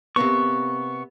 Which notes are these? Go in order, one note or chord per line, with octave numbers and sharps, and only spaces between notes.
C3 A#3 B3 C#6